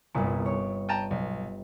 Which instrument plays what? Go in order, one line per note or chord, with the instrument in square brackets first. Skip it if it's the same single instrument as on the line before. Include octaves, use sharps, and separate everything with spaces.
[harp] G1 C2 [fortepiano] A#2
[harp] C#5
[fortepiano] G5 A5 A#5 [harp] D#7
[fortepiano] B1